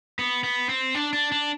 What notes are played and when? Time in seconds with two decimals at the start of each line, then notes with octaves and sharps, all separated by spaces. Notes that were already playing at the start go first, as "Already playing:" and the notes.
0.19 B3
0.44 B3
0.69 C4
0.95 D4
1.13 D4
1.32 D4